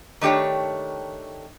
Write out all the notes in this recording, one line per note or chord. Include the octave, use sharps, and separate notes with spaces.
D#3 A3 D4 G4 C#5